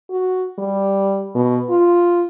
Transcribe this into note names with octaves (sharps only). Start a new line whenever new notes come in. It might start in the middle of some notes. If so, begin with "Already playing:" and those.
F#4
G3
B2
F4